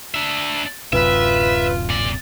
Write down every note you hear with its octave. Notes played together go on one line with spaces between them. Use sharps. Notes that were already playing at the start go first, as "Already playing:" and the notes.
D4 E5
D1 F#2 C3 F4 B4 E5
A#2 D5